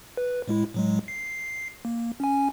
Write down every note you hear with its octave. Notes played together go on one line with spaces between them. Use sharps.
B4
A2 G#3 E4
A2 F#3 G#3
C7
A#3
C#4 G#5